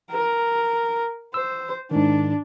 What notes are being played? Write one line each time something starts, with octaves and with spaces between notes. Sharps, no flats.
A#4
C5 E6
G#2 D#3 D4